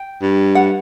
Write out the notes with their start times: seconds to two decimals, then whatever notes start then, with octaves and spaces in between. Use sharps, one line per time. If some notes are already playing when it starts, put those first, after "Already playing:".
Already playing: G5
0.22 G2
0.55 F#5